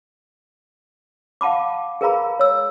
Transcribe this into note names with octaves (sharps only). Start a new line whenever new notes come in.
F5 F#5 A5 B5 D6
G#4 A#4 B4 F5 A#5 B5
C#5 E6